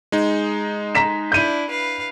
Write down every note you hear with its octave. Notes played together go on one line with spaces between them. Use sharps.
G#3 D#4
A#5 B6 E7
D4 E4 G6 D#7
B4 F5